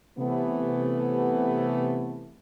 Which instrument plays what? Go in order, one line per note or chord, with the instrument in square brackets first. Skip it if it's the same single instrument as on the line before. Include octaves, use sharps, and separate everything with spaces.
[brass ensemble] C3 E3 A3 B3